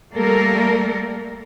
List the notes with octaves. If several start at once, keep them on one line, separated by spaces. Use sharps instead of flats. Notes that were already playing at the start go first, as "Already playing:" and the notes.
G3 A3 A#3 A4 A#4